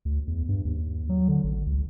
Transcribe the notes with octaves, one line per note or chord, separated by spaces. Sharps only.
D2
E2
G2
D#2
F#3
D3
A1
C#2